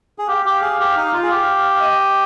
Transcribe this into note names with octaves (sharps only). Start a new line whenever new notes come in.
G#4
G4 F5
G4
G#4
G4
D#4
F4
G#4
G4
D#5